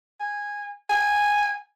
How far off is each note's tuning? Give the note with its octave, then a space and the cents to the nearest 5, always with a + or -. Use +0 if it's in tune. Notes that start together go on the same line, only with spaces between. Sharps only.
G#5 -10
G#5 -10